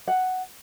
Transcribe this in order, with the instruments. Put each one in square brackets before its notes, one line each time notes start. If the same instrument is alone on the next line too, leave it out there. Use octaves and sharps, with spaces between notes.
[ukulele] F#5